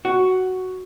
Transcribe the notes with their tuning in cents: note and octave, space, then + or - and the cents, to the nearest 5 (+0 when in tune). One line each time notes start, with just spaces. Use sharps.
F#4 +5